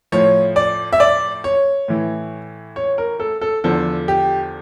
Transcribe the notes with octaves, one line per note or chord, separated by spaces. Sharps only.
A2 F3 C#5
D5
E5
D5
C#5
A2 E3
C#5
A#4
A4
A4
E2 D3 F3 A4
G4